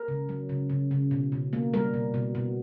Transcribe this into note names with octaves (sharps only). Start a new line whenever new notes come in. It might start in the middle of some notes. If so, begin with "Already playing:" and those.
Already playing: A#4
C#3
F#3
C#3
C#3
C#3
B2
B2
A#3
G3 A#4
B2
B2
B2